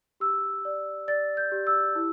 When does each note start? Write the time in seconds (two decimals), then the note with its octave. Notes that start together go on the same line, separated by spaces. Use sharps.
0.20 G4 E6
0.65 D5
1.08 D5 A6
1.37 G6
1.52 G4
1.67 E6
1.95 E4